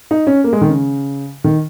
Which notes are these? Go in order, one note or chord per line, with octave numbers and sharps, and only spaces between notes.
D#4
C#4
A#3
G#3
D#3
C#3
D#3